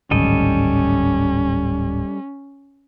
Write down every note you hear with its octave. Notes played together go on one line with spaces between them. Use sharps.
D1 G#1 G3 C#4 A4 D#5